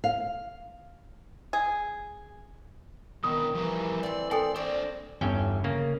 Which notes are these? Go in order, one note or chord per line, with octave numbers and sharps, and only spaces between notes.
F5
G#4
B2 D#3 E3 B3 D#6
E3 F3 G3 A#4
C4 A4 D5
C4 A4 D5 G5 G#5
D4 C5 D5 C#6
G1 E2 G2 C#4 G5
C#3 A#3